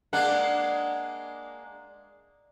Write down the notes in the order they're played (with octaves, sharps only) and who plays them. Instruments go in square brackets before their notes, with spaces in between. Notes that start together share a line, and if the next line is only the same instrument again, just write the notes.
[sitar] G#3 A#3 D4 [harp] F#5